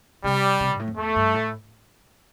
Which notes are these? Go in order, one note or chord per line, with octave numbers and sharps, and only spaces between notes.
C3 G3
C3
A#2
G2
A2
F2
E2 A3
G2
A2